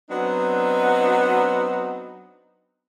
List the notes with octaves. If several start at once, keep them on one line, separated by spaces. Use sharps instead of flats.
F#3 B3 C4 D4 D#4